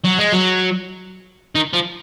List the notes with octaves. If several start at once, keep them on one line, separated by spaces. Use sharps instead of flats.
F#3
G#3
F#3
D#3
F3